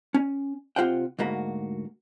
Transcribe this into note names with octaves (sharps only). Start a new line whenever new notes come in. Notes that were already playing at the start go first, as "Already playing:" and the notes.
C#4
C3 F3 F4 C5 F#5 G5
D2 G#2 A#3 F#4 B5